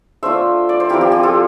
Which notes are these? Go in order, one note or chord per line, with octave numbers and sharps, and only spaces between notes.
A3 D4 F4 C5 E5
D5
C5
F3 C4 E4 G4 A#4
G4
G4
F4 A4